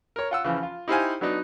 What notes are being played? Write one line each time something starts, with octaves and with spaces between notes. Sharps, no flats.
A#4 C#5
F4 F#5 E6
C#3 E3 F3
F4
D#4 E4 G4 C5 F5 G#5
F#3 B3 D4 D#4